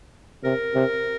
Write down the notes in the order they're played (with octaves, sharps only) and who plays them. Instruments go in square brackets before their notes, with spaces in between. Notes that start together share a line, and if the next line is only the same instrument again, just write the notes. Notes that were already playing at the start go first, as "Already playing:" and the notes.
[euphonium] C3 [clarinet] A#4
[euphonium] C3